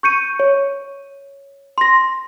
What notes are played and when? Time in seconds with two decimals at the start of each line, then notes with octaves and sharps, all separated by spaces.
0.03 C#6 G6 C#7 D#7
0.40 C#5
1.78 C6 A#6